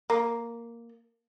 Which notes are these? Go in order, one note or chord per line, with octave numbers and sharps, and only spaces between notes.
A#3